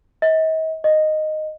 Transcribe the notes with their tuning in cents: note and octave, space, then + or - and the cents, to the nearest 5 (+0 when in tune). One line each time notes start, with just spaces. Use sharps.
D#5 +45
D#5 -5